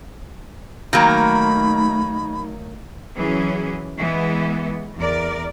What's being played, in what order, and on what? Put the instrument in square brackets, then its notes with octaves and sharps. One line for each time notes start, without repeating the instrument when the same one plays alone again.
[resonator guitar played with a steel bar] D#3 F#3 A#3 [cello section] A3 D#4 [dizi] B5
[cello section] E3 F#3 C#4 G#4
E3 G#3 B3
E2 A#4 D5